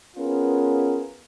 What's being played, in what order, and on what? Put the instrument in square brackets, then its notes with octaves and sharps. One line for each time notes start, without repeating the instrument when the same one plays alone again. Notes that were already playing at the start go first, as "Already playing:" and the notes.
[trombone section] B3 C#4 F4 G#4 A#4 B4